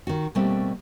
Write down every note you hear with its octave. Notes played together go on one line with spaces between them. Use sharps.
D#3 F#4
B2 G3 A3 A#3 C4